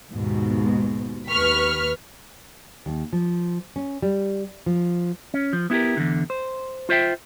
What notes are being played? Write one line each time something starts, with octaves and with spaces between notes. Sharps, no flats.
D#2 G#2 B2
D#2 B4 C#6 F6 B6
D#2
F3
C#4
G3
F3
C#4
F3
B3 E4 F#4 G4 A#4
E2 D3
C5
F4 C5 E5 G5